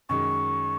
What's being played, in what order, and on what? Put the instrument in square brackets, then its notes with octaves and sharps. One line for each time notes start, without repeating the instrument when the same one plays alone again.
[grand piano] F#2 D#3 G#3 [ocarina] C#6